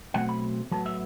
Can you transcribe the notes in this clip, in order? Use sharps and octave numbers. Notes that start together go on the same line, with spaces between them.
B2 F#3 A3 C4 F#5
B5
A2 F#3 B3 A5
E5